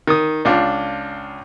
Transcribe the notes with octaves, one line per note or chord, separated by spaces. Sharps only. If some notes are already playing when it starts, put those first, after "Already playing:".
D#3 D#6
C#2 D4 F4